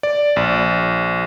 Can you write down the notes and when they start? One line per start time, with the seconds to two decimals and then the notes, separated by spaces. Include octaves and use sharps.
0.03 D5
0.36 A#1